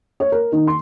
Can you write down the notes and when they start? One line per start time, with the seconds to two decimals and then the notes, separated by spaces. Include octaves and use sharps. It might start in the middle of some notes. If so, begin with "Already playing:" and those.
0.20 C#5
0.32 A#4
0.52 D#3
0.67 C6